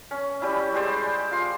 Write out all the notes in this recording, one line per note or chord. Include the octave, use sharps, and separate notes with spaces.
C#4
G3 C#4 E4
G#3 G4 C5 D5
F4 C6